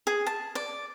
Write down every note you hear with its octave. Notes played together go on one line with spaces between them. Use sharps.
G#4
A5
D5